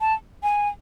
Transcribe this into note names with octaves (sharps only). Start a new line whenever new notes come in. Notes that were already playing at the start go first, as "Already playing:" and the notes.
A5
G#5